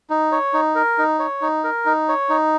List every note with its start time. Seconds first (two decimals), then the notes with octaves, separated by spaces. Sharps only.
0.10 D#4
0.32 C#5
0.53 D#4
0.75 A#4
0.98 D#4
1.19 C#5
1.42 D#4
1.64 A#4
1.86 D#4
2.08 C#5
2.29 D#4